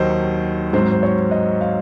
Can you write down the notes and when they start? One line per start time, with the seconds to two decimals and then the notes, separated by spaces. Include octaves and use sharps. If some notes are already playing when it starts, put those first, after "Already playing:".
Already playing: D#2 D#3 F#3 C5 D#5
0.73 G#2 F#3 C4 C5
0.91 C5
1.03 C#5
1.31 D#5
1.61 F5